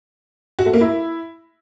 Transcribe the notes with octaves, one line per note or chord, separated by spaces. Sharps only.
F#4
A3
A#3
E4